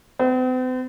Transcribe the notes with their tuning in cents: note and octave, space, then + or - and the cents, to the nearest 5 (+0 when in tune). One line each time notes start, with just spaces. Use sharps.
C4 -45